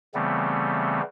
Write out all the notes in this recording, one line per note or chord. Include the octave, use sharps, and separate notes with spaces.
C#3 E3 G3 A3 B3 C4